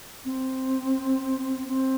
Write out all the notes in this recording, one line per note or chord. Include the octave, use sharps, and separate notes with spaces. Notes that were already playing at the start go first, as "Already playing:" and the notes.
C4
C4